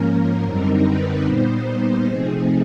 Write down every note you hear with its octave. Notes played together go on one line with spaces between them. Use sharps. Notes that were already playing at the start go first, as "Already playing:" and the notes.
Already playing: G#2 F3 A#3 C#4 A#4
F#2 D3 G3 C4 D#4 A#4
B4
A#2 G3 B3 D#4 C5
C3 F3 A3 C4 D#4 G#4